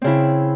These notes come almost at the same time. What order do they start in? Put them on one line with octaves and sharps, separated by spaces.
C4 C#3 E4